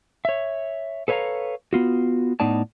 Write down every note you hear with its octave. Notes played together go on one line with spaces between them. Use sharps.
C#5 E5
A4 B4 C#5 E5 F5 A#5
B3 F4 F#4
A2 B3 D#4 D5 A5